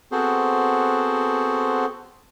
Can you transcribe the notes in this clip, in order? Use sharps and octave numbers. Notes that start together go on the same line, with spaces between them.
B3 C4 F#4 G#4 A4 C5